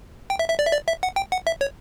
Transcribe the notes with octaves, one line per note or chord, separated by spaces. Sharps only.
G5
E5
E5
D5
E5
D5
E5
F#5
G5
F#5
E5
C#5